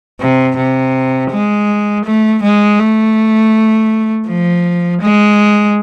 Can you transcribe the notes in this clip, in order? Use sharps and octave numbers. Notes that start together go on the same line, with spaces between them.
C3
C3
G#3
A3
G#3
A3
F3
G#3